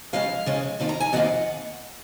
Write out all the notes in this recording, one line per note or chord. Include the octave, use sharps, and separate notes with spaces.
C#3 F3 G#3 C#4 F5
C#3 F3 G#3 C#4
F2 D#3 A#3 F4
A#5
G#5
F2 D#3 A#3 F4 F#5